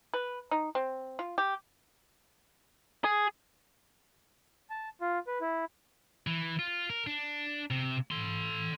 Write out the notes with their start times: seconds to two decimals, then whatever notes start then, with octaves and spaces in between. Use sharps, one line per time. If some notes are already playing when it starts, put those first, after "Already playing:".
0.14 B4
0.51 D#4
0.75 C4
1.19 F4
1.38 G4
3.04 G#4
4.70 A5
5.01 F4
5.27 B4
5.41 E4
6.27 E3
6.59 F4
6.90 A#4
7.07 D4
7.71 C3
8.11 A4 C6